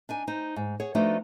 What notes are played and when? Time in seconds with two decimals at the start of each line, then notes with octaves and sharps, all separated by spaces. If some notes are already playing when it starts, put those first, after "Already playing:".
0.09 D4 D#4 G#5
0.27 D#4 C5
0.56 G#2
0.80 G#4 C#5 F#5
0.95 F3 A3 B3 D4 D#4 F#4